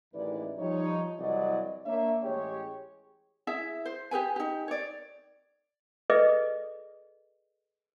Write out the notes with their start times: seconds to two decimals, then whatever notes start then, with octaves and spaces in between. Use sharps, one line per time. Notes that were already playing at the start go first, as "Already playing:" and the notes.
0.13 A1 D#2 G#3 E4 B4 D5
0.58 F3 G3 D#4 C#5
1.19 C2 E3 F#3 D5 D#5
1.85 A#3 D4 C#5 E5
2.23 A1 G#3 G4 G#4 C#5
3.47 E4 G#4 E5
3.86 C5
4.11 G4 G#4 B4 G#5
4.36 D#4 G4
4.68 C#5 D5
6.10 G#4 A4 B4 D5 D#5